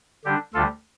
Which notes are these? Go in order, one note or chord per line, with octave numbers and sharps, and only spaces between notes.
D3 G3 D4 G4
D2 D3 G3 F4 A4